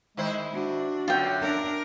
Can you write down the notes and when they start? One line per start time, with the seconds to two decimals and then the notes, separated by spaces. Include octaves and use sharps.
0.17 D#3 G#3 E4 C5
0.55 D4 F#4
1.08 F#2 B2 D3 F4 G5
1.42 D4 A#4